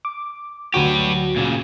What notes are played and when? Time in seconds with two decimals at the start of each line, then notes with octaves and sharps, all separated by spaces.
0.05 D6
0.74 D2 F#3 F#4 G4 B4
1.36 A#2 C#3